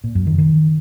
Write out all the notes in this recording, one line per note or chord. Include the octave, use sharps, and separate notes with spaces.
A#2
F#2
D#3
D#3